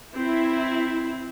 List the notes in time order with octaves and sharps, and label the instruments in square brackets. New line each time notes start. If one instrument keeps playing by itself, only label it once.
[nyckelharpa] C4 [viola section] E4